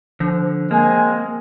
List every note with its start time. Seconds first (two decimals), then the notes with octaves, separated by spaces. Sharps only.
0.20 D3 F3
0.71 G#3 A#3 C4 G#5